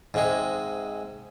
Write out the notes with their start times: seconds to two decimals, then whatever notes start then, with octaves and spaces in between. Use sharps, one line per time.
0.14 G#2 C3 G#3